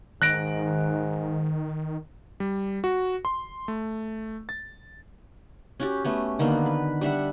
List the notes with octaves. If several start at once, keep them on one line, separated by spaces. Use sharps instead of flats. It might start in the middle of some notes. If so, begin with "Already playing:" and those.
G#2 D#3 F#6 A#6 D7
G3
F#4
C6
A3
A6
C#4 F#4 G4
A3 B3 C#4
D3 D#3 A#3 B3
B4
G3 D4 E5 F#5